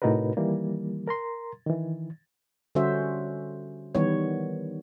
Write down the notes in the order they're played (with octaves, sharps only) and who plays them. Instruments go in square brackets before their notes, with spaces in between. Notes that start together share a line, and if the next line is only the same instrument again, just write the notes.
[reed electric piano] A2 C3 D#4 F#4 A#4 B4
D#3 E3 G3 A#3
A#4 A#5 C6
D#3 E3
[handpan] D3 G3 C#4 F#4 C5 E5
D#3 E3 G3 B3 C#5